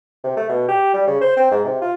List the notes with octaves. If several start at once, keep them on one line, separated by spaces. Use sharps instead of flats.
C3
A3
B2
G4
G3
C#3
C5
C4
G#2
C3
F4